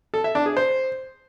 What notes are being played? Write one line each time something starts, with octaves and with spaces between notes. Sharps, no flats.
A4
E5
D4
G#4
C5